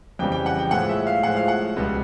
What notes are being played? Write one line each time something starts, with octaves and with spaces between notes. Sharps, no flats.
F2 C#3 E3 G3 G5
G5
F#5
G5
A2 F3 G#3 F#5
E5
F5
A2 F3 G#3 F#5
F5
F#5
C#2 B2 G3